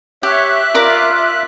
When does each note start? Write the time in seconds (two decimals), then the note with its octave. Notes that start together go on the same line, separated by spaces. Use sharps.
0.23 G4 C#5 E5 F#6
0.75 F4 A#4 D5 D6